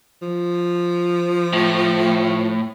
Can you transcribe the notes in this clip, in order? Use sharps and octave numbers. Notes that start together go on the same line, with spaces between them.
F3
A2